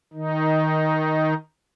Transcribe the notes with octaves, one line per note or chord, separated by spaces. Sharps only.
D#3 D#4